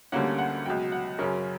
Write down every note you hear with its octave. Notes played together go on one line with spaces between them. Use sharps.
D2 D3 G3 A#3 C#4 F#5
F#5
C#2 B2 F#3 G5
F#5
F#2 C#3 F#3 C#4 A#4